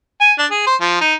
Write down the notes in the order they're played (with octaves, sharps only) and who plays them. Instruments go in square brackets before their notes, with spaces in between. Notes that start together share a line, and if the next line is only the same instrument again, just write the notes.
[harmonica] G#5
D4
G#4
C5
F3
D#4